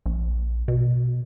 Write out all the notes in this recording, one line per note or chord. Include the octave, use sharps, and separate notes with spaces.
A#1
B2